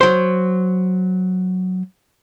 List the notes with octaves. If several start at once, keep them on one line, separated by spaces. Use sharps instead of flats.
F#3 C5